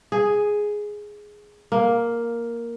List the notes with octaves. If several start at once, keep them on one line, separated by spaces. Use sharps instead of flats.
G#4
A#3